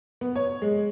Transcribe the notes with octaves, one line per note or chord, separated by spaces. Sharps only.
B3
C#5
G#3